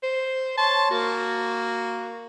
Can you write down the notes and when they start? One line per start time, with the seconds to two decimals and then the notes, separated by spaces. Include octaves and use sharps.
0.03 C5
0.57 C#5 A5 C6
0.91 A#3 F#4